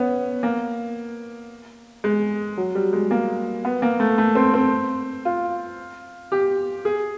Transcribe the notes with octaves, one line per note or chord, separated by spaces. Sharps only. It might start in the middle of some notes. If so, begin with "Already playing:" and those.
Already playing: B3 C#4
A#3
G#3
F#3
G3
G#3
A#3
B3
A#3
A3
A3
C4
C4
F4
G4
G#4